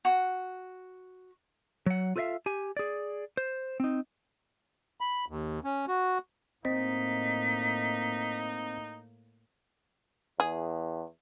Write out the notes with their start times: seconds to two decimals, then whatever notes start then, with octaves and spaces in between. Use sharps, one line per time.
0.05 F#4
1.86 F#3 F#5
2.16 F4 A4 B4 D5 E5 F5
2.46 G4 G#5
2.77 G#4 D5
3.37 C5
3.80 C4 D#4
5.01 B5
5.28 D#2
5.64 C#4
5.88 F#4
6.65 A2 A#3 C4 D#4 C5 D#5 B6
10.40 E2 G#4